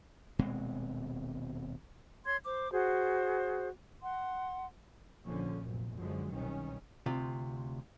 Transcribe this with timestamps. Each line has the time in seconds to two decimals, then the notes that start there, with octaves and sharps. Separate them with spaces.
0.39 D#1 B2 G#3 C4
2.25 C#5 C6 G#6
2.45 C5 D6
2.72 F#4 G#4 C5
4.02 F#5 C6
5.25 A#1 D3 F3 C#4
5.64 F1 A#1 F#2 A#2
5.97 F#2 D3 F3 F#3 G#3
6.32 C2 B2 D#3 C#4
7.06 D2 C3 F4